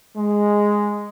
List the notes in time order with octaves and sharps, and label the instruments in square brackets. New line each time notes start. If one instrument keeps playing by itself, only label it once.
[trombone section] G#3